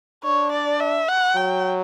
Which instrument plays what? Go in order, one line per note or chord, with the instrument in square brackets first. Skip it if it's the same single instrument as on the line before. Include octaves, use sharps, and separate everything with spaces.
[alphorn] D4 [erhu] C#5
[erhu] D5
E5
F#5
[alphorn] F#3 [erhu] G5